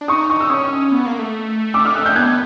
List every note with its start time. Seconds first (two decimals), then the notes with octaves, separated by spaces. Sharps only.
0.01 D4
0.08 D#4 C#6 D#6
0.30 C#6 D#6
0.40 E6
0.50 C#4 C#6 D#6
0.92 B3
1.06 A#3
1.19 A3
1.74 D6 E6
1.85 D#6 F6
1.95 E6 F#6
2.05 F6 G6
2.16 B3 F#6 G#6